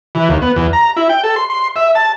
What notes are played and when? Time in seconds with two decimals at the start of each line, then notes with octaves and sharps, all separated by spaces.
0.15 E3
0.29 D#2
0.42 B3
0.56 E2
0.73 A#5
0.96 E4
1.09 G5
1.24 A4
1.36 C6
1.50 C6
1.76 E5
1.95 A5